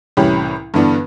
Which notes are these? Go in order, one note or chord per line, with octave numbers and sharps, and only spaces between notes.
C2 A2 E3 C#4 G4 B5
G2 D3 E3 B3 D4